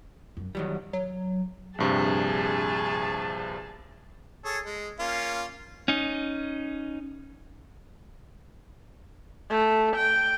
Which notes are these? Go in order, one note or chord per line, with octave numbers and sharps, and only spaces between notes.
F#2 F#3
D#3 E3 F#3 G3
F#3
A#1 G2 C3 G#4 A5
G#4 A4 C#5
G#3
A#3 C#4 F4
C#4 D#4
A3
G5